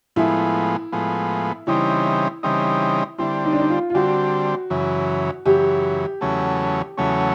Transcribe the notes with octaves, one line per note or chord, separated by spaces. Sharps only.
A2 F3 G#3 B3 E4
A2 F3 G#3 B3
C#3 E3 G3 C4 D#4 E4
C#3 E3 G3 C4 D#4
D3 G3 C4 E4
D#4
D4
D#4
F4
F4
D3 G3 C4 F#4
F#2 C#3 E3
F#2 C#3 E3 G4
E2 C#3 F#3 A3 C#4
E2 C#3 F#3 A3 C#4